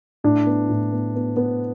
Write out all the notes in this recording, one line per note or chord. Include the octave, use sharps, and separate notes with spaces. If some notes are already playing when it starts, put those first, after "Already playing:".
A2 D4
B3
A2
B3
B3
B3